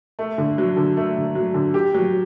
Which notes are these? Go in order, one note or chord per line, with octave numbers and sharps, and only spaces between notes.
A3
D3
F#3
D3
A3
D3
F#3
D3
G4
F#3